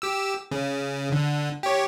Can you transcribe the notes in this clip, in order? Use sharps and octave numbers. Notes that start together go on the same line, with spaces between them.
G4 E6
C#3
D3
G4 C#5